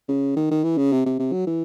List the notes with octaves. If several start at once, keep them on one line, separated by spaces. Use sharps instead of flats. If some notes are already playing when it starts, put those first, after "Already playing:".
C#3
D#3
D#3
E3
C#3
C3
C3
C3
F#3
E3